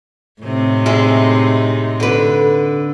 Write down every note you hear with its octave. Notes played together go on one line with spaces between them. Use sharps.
A2 C3 D#4
G#3 E4
D3 B4